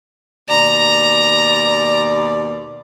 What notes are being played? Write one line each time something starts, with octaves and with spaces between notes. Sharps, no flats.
D#2 B2 D5 A#5